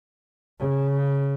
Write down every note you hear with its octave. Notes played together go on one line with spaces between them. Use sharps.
C#3